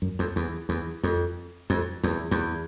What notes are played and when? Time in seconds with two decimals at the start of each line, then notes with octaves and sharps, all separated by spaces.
0.02 F#2
0.19 F2
0.36 E2
0.69 E2
1.03 F2
1.70 F2
2.03 E2
2.31 E2